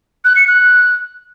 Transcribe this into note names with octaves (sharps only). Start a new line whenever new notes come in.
F#6
C#7
F#6